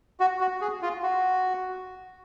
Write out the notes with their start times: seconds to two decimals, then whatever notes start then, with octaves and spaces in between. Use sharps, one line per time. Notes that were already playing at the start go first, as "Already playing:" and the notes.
0.20 F#4
0.40 F#4
0.61 G#4
0.82 F4
1.03 F#4